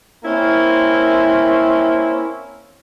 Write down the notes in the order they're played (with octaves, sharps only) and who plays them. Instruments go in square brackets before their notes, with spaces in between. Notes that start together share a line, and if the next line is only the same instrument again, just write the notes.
[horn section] A#3 C4 C#4 E4